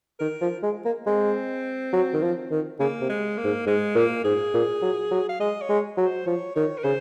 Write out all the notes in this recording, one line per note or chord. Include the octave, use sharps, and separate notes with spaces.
D#3 A#4
F3
G#3
A#3
G#3 C4
F#3
D#3
F3
D#3
C#3 A#3
C3
G#3
A#3
G#2
G#2 G#3
A#2 A#3
G#2 G#4
A#2
F#3
F#3
F5
G#3 D#5
C#5
G#3
F#3
C5
F3 C#5
D#3 C#5
A#4
C#3 C5